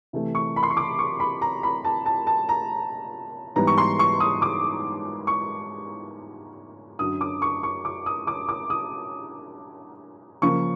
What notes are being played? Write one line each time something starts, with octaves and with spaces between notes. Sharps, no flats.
C3 E3 A3
C#6
B5
C6
C#6
D6
C#6
B5
A#5
B5
A5
A5
A5
A#5
G#2 E3 G3 B3 A#5
C#6
C6
C#6
D#6
D6
C#6
F#2 D3 F#3 D#6
D6
C#6
C#6
D6
D#6
D6
D6
D#6
C#3 F3 A#3 C#6